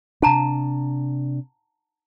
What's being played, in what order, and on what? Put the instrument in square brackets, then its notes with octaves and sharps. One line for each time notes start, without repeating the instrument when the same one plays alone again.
[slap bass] C3 D4 [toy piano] F#5 A5 A#5